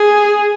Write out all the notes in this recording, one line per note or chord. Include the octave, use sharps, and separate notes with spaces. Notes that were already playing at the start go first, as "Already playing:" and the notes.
Already playing: G#4